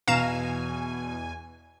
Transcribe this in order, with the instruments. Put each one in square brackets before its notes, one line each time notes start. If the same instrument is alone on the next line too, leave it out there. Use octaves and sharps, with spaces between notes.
[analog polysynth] E2 G#5 [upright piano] B2 [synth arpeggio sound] F5 A#5 E7